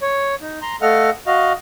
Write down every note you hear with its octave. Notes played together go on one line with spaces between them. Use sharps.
C#5
D#4
A#5 C6
A3 A4 D#5 F5 F#5 F6
F#4 D#5 F5